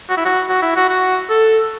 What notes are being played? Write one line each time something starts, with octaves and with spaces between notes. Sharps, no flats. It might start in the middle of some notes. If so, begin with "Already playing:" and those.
F#4
E4
F#4
F#4
E4
F#4
F#4
A4